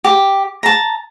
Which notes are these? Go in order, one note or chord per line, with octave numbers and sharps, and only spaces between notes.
G4
A5 A#5